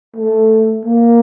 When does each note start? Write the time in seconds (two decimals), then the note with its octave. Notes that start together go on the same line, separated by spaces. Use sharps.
0.17 A3
0.86 A#3